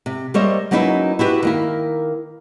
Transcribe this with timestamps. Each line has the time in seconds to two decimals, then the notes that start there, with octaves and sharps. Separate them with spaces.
0.06 C3
0.34 G3 A#3 C5 C#5 D#5 E5
0.71 F#3 A#3 C#4 D#4 E4 B4
1.19 E4 F#4 G4 B4
1.43 D#3 A#3 E4